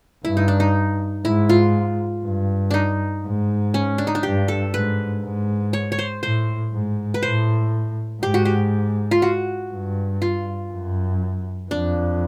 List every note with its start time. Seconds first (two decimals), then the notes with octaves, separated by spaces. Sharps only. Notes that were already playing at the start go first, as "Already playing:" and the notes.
0.24 G2 E4
0.37 D#4
0.48 D4
0.60 D#4
1.25 G#2 E4
1.49 F4
2.25 G2
2.71 D4 D#4
3.24 G#2
3.74 C#4
3.98 D4
4.07 D#4
4.15 D4
4.23 G2 G4
4.48 A4
4.73 G#2 B4
5.23 G#2
5.73 C#5
5.92 C#5
5.99 C5
6.23 A2 C5
6.72 G#2
7.14 B4
7.23 A2 C5
8.22 G#2 G4
8.34 F#4
8.45 G4
9.11 F4
9.22 F#4
9.72 G2
10.22 F4
10.72 F#2
11.71 F2 D4